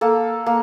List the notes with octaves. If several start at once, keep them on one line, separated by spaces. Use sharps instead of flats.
A#3 A4
A#3